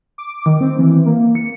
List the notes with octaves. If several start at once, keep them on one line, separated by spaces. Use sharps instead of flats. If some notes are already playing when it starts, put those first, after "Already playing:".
D6
D#3
C4
E3
A#3
C#7